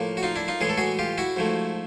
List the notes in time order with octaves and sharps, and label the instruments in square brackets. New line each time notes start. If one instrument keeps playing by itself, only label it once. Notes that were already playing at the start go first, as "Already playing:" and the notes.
Already playing: [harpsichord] A2 F3 A#3
F#4
D#4 F4
D4 E4
D#4 F4
A2 E3 G#3 G#4
A4
F#4 G#4
F4 G4
E4 F#4
G#2 F3 A3